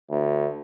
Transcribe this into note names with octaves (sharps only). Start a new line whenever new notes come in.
D2